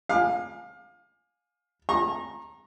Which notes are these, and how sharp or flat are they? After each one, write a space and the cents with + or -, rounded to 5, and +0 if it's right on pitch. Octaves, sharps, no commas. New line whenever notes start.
F5 +25 G#5 +0 D6 +35
A#5 +0 C#6 -40